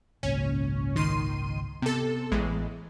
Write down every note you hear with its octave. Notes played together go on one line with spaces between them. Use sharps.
G#1 C#2 A#2 C#4
D#3 C6 D#7
C3 B3 A4
A1 E3 G#3